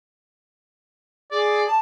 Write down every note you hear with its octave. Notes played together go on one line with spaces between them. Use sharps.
G#4 D5
A5